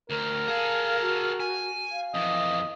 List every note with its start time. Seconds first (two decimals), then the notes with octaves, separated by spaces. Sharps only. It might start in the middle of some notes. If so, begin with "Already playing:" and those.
0.10 D2 A#4
0.48 G#4 A4 F5
1.01 F#4
1.40 G#5
1.92 F5
2.14 F2 E3 D#5